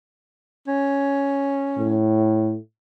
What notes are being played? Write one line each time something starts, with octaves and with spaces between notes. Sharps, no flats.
C#4
A2